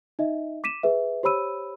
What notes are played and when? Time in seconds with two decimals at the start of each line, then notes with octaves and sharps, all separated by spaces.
0.19 D#4 D#5 E5
0.64 D6 B6 D#7 E7
0.83 G#4 B4 E5
1.23 G4 C5 C#5 B5 E6 D#7